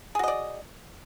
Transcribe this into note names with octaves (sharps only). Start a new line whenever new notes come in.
F#4 G#4 D5 D#5